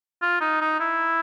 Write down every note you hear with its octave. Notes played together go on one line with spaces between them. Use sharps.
F4
D#4
D#4
E4